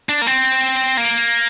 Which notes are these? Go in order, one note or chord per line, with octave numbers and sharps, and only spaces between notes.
D4
A#3
C4
A#3